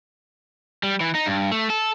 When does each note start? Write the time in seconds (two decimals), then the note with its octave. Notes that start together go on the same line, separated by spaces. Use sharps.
0.83 G3
1.00 E3
1.15 D#4
1.26 G2
1.52 A3
1.70 A4